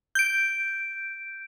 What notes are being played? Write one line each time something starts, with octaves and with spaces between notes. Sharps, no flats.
G6 D7